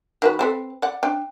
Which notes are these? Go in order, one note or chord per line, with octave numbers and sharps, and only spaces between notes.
D#3 F#4 B4
C4 A4 B4
D5 F#5
D4 G5